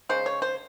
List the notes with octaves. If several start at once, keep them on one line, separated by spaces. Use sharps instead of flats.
C#3 G#3 C5
C#5
C5